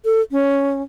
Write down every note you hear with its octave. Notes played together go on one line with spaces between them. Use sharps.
A4
C#4